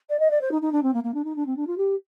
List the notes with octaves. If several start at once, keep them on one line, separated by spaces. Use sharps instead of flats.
D5
D#5
D5
C5
D#4
D#4
D4
C4
A#3
A#3
D4
D#4
D4
C4
D4
F4
G4